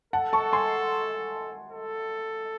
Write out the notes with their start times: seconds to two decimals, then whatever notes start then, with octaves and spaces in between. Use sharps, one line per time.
0.13 A4 F#5 A5
0.33 A5 C#6
0.53 G#5 C6
1.71 A4